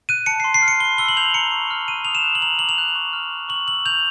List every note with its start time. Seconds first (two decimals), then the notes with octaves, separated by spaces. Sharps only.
0.09 F#6 D#7
0.26 A5 C#7
0.40 C6 C7
0.54 C7
0.62 F6
0.68 C#7
0.80 B5 G7
0.98 E6 G7
1.08 F#7
1.17 G6 F7
1.34 A#5 C#7
1.52 C#6
1.71 F6
1.88 A#5 D#7
2.05 D#6 F7
2.15 E7
2.24 F#6
2.35 F#7
2.42 A#5 F7
2.59 D6 F#7
2.69 F7
2.78 F#6
2.95 C#6
3.13 F6
3.31 C#6
3.49 C#6 F#7
3.67 E6 F#7
3.86 G6 F7